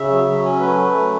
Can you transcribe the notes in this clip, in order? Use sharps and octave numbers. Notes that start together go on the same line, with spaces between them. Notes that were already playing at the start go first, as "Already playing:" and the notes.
Already playing: C#3 E5
F#3
F#3
C#4
A3 B4
A3
F#3